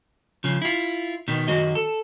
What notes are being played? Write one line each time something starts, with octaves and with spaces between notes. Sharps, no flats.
C#3 F3
E4 F4
B2 D#3
F#2 D#3 F#4 D#5
A4